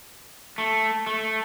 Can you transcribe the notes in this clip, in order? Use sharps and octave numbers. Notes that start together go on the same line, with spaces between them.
A3
A3